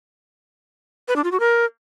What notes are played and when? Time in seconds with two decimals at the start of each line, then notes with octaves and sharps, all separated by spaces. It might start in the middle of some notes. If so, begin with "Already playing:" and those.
1.08 B4
1.16 D4
1.24 F4
1.32 F#4
1.40 A#4